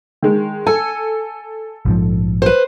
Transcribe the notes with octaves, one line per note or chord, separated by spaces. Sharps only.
D#3 G#3
A4 G#5
A#1 G#2 F3
B4 C5